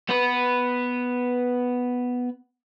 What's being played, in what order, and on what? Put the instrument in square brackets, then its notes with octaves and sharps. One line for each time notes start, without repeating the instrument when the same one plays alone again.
[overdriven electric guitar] B3 B4